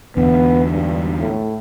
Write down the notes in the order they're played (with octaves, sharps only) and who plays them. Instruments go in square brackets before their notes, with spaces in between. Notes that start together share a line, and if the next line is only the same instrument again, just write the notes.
[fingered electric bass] E2 D3 [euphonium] B3
[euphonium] G2
A2